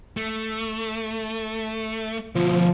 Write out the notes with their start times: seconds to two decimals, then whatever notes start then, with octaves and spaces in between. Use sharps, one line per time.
0.17 A3
2.35 D2 B2 F3